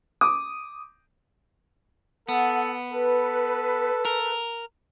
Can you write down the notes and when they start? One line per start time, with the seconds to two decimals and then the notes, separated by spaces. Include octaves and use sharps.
0.21 D6 D#6
2.29 B3 A4 F#5
2.91 A4 B4
4.05 A#4